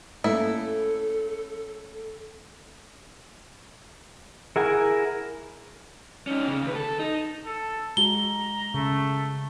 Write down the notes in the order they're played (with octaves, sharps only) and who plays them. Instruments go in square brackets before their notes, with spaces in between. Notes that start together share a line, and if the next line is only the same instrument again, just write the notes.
[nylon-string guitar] A3 A#3 C#4 [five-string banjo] E4 [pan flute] A4
[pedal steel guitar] E4 A#4 G#5 [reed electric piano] G#4 F#5
[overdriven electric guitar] C#4 D#4
C#3
D#2 B4
A4
D#4
[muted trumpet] A4
[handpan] G#3 F#4 [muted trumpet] A#5 [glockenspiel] G7
[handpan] C#3 [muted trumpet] A3